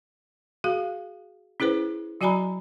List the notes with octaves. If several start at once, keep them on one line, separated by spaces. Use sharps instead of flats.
F#4 G#4 F5
C#4 E4 G#4 B4 C5
F#3 F#4 D5 G#5 A#5 B5